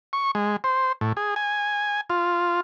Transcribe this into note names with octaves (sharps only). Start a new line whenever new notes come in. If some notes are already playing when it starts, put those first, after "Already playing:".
C#6
G#3
C5
A2
G#4
G#5
F4